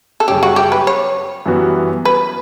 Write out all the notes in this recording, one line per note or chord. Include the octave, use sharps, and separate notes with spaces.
A4
F#2 C#3 G3 C#4 G4
F#4
G4
B4
C#5
F#2 E3 G3 B3 F#4
B4